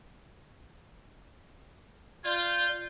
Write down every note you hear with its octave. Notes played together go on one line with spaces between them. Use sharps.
F4 D5 G6